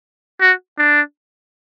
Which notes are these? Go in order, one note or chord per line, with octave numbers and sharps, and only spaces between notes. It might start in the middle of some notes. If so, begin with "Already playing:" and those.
F#4
D4